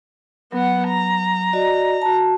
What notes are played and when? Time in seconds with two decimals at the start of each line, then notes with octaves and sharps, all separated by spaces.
0.52 F#3 B3 F#5
0.88 A#5
1.53 F#4 D5 D#5
2.02 F#4 A5